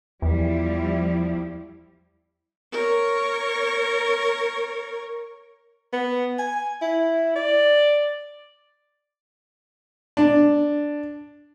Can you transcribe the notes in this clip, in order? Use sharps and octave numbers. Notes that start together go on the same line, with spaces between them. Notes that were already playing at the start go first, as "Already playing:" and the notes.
E2 F3 G3 E4
A#4 C#5
B3
G#5
E4
D5
D4